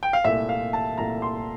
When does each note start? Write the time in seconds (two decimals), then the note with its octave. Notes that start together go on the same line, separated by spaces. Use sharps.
0.03 G5
0.13 F5
0.24 C2 A#2 A3 E5
0.49 F5
0.73 A5
0.98 C2 A#2 A3 A#5
1.22 C6